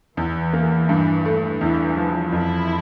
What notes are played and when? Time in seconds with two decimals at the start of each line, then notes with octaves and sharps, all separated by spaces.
0.17 E2 E3
0.53 A#3
0.89 G2
1.25 A3
1.61 E2 E3
1.97 F3
2.32 F2 E4